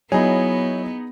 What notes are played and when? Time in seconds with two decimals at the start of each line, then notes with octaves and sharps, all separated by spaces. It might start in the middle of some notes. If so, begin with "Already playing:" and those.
0.12 F#3 B3 D#4 E4 G#4 C#5